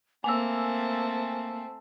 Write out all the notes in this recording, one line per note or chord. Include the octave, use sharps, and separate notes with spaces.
A3 A#3 C4 G#5 E6